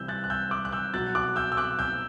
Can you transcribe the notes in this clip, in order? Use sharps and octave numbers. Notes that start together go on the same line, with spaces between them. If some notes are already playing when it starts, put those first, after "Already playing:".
Already playing: C3 E3 G3 E6 G6
F#6 A6
F#6
E6 G6
D6 F#6
F#6
E6 G6
B2 F#3 F#6 A6
D6 F#6
E6 G6
E6
D6 F#6
E6 G6